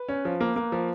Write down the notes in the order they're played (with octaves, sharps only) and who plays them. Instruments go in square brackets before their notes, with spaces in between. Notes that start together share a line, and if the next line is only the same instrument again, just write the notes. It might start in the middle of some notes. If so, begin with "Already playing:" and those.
Already playing: [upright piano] B4
C#4
F3
A#3
A#3
F3